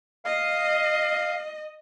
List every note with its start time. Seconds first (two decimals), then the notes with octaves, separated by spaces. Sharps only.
0.25 D#5 F5